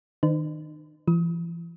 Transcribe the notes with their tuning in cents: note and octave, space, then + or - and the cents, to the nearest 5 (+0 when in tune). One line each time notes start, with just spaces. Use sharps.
D#3 +0 D#4 -45 C5 -45
E3 +40 D#6 +35